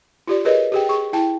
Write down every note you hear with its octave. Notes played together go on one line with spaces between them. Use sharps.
F4 G4 D5
G#4 A#4 B4 C#5 D#5
G4 G#4 G5
G#4 C#6
E4 G5 A5